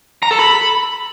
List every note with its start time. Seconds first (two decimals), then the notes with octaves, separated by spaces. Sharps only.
0.23 A#5
0.31 A4
0.39 B5